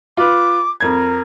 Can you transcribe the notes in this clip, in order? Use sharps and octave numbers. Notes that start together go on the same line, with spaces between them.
F4 B4 D6
F2 A#4 G#6